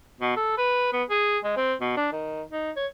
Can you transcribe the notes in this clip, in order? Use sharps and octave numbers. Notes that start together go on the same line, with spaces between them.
B2
A4
B4
B3
G#4
G#3
C4
B2
D4
D#3
D#4
C#5